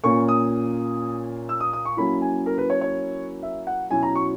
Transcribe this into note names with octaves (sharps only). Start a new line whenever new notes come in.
A#2 A#3 C#4 C#6
D#6
E6
D#6
D#6
C#6
F#3 A#3 C#4 E4 B5
G#5
A#4
B4
C#5
C#5
E5
F#5
B2 F#3 C#4 E4 G#5
A#5
C#6